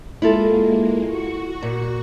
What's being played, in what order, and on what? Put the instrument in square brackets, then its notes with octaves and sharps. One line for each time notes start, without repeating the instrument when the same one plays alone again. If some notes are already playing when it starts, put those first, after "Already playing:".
[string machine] G#3 A#3 [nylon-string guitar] E4 F4 A4
[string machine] F#4 C#6
[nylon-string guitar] A#2